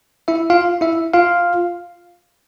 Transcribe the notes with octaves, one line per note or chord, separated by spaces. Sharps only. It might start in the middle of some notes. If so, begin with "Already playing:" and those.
E4 E5
F4 F5
E4 E5
F4 F5